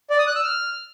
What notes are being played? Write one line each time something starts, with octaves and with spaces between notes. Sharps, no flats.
D5
D#6
F#6
E6
F6